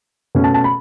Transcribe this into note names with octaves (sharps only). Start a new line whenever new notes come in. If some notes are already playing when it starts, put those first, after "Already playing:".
B2 A3 C#4
A5
A5
B5